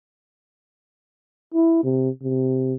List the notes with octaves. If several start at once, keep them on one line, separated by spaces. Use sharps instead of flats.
E4
C3
C3